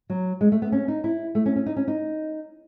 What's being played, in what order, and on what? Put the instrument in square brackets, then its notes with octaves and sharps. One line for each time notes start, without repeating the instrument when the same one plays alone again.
[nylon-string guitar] F#3
G#3
A3
B3
C#4
D#4
E4
A3
C#4
C#4
D#4
C#4
D#4